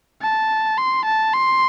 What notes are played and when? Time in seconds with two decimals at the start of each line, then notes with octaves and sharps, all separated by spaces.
0.22 A5
0.78 C6
1.05 A5
1.33 C6